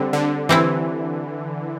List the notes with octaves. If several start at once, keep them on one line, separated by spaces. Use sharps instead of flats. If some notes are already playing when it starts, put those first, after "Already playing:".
Already playing: D3 G3 C4
D3
E3 G3 C4 E4